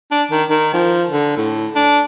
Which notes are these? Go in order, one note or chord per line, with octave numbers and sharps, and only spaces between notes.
D4
D#3
D#3
F3
D3
A2
D4